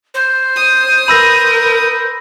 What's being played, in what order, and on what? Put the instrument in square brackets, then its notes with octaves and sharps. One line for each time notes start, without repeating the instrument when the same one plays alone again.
[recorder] C5
[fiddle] D#6
[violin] A#4 B4 [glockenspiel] B5 E6 A#6